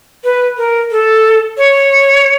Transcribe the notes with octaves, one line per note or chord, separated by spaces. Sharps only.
B4
A#4
A4
C#5